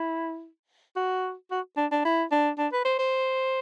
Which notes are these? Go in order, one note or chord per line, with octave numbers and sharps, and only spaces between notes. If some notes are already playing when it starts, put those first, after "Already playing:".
Already playing: E4
F#4
F#4
D4
D4
E4
D4
D4
B4
C5
C5